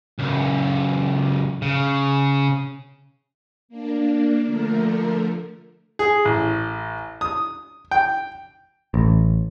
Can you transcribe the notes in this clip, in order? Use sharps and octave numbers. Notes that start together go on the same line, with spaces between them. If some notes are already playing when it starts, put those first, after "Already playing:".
C#2 F#2
C#3
A#3 D4
D3 F3 A3 A#4
G#4
A1
D#6
G5
A1